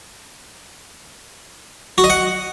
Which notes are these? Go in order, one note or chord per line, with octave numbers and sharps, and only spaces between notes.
F#4
D#5
F#5